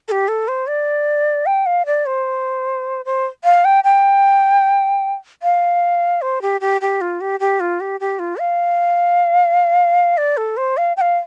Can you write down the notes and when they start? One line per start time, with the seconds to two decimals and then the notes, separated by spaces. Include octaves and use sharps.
0.08 A4
0.11 G4
0.28 A4
0.48 C5
0.67 D5
1.46 G5
1.66 F5
1.86 D5
2.06 C5
3.05 C5
3.44 F5
3.65 G5
3.84 G5
5.43 F5
6.22 C5
6.42 G4
6.61 G4
6.81 G4
7.01 F4
7.21 G4
7.40 G4
7.60 F4
7.80 G4
8.00 G4
8.19 F4
8.39 F5
10.17 D5
10.37 A4
10.57 C5
10.77 F5
10.97 G5
11.01 F5